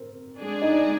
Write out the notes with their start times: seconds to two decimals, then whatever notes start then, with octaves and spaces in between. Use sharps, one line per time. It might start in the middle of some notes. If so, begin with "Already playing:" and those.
Already playing: C4 A#4
0.38 G#3 D4 G#4 D5
0.62 D#4 D#5